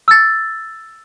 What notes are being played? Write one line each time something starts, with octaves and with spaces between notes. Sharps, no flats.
E6 A6